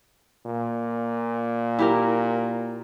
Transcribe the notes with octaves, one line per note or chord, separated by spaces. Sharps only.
A#2
E4 G4 A#4